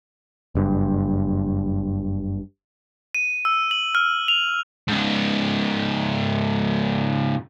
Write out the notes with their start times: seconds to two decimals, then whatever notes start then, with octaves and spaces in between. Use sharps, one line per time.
0.55 F#1 G2
3.15 D#7
3.45 E6
3.71 F#7
3.95 F6
4.28 F7
4.88 G#2 C#3